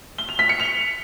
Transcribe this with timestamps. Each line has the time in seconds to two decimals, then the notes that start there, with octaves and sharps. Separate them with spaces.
0.18 G7
0.29 F7
0.39 B6
0.49 C#7
0.60 F7